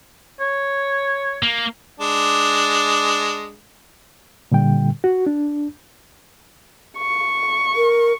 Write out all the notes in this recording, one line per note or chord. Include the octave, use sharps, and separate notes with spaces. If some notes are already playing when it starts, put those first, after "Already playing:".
C#5
A#3
G#3 D4
A#2 D3 G3 G5
F#4
D4
C#6
A#4